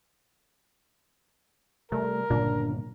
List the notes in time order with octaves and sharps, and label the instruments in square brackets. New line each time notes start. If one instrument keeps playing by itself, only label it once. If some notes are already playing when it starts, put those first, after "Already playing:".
[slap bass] C3 G3 [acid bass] A3 [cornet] A#4
[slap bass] G1 C#3 F#3 [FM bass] A#2 [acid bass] D4